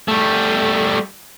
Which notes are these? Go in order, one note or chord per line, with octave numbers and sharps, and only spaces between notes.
G3 A3